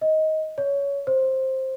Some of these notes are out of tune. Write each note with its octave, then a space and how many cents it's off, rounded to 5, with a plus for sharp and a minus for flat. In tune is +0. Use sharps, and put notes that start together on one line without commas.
D#5 +15
C#5 +20
C5 +10